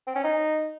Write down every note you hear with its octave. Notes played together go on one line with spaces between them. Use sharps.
C4
C#4
D#4